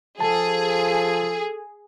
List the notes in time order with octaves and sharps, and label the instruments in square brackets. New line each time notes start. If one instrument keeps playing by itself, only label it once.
[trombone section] F3 [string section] G#4 [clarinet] A4 [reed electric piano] A5